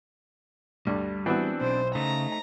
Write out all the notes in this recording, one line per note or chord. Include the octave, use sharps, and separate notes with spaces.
D2 G2 G3 D4
E3 B3 C4 D4 F#4
B1 C5
C#3 A3 D#4 A#5